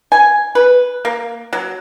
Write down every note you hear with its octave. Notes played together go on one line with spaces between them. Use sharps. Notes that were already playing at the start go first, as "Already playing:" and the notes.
G#5
B4
A#3
F#3